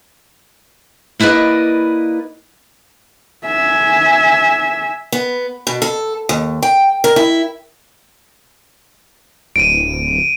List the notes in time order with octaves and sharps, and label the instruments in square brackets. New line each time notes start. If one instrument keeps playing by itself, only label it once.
[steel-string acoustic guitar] A#3 E4 B4 D5 D#5
[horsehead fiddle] E5 G#5
[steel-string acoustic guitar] B3
B2
A4
D#2
G5
A#4
E4
[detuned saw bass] D1 [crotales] D7 D#7